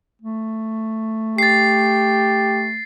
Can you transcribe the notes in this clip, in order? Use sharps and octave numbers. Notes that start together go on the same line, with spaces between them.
A3
G4 A6 C7